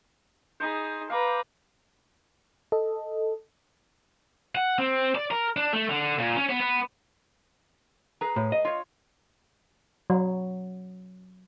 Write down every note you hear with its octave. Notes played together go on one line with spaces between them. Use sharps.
D#4 G#4 C5 B5
B4 F5 A#5 D6
A4 D#5
F#5
C4
D5
A#4
D4
A3
D3
A#2
C#4
B3
B3
G#4 B4 A#5
A2
D#5
F4 C#5
F#3